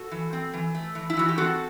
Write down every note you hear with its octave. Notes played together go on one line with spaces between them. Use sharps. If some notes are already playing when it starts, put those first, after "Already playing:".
Already playing: F#4 A4
E3
C4
E3
A3
E3
E4
E3 F#4
G4
C4 F#4 A4